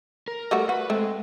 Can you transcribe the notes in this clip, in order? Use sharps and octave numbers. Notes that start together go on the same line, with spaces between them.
A#4
G3 A3 F#4
F#4 B4
G#3 A3 C4